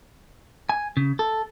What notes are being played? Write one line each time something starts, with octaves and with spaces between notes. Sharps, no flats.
G#5
C#3
A4